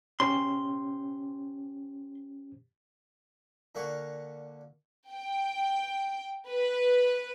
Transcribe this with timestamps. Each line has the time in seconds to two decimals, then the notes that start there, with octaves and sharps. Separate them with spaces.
0.20 C#4 G4 C5 C6
3.75 A#2 D3 A#3 F5 F#5 C#6
5.11 G5
6.48 B4